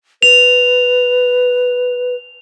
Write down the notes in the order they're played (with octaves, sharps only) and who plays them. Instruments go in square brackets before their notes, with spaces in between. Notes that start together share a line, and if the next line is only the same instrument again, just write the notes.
[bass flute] B4 [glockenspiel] F7